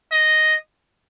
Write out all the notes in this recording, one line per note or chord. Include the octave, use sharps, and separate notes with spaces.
D#5